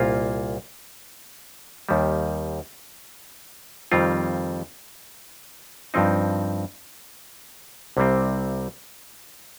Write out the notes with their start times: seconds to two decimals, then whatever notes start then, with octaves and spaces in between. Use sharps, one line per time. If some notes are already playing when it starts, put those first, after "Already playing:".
Already playing: C2 A#2 A#3 F4
1.89 D#2 D#3 G3
3.91 F2 D#3 G3 C4 F4
5.94 G2 F3 C4 D#4
7.97 C2 C3 G3 C4